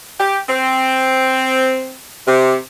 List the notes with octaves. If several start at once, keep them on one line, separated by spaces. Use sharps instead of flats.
G4
C4
C3